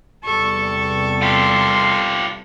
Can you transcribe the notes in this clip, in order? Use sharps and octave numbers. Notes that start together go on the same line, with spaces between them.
E2 C3 G3 A4 C#6
F4 G4 C6